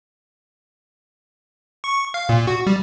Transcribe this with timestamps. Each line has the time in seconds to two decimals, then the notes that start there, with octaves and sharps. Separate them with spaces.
1.84 C#6
2.14 F5
2.29 A#2
2.47 F#4
2.67 G3